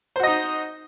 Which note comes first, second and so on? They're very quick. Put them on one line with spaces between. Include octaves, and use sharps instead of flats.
C5 F#4 D#5 D#4